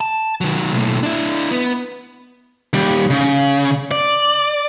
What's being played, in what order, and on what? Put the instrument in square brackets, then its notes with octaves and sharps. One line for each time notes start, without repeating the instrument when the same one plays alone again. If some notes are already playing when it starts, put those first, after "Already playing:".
[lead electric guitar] A5
D#3 F#3
B1 A2
D4 E4
B3
D#2 G3
C#3
D5